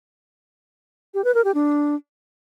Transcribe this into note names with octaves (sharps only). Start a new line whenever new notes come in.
G4
B4
A#4
G4
D4